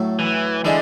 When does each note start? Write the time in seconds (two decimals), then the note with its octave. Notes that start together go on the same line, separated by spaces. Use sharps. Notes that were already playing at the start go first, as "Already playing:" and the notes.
Already playing: A2 F#3 A3
0.19 E3
0.65 D3 E3 G#3 D4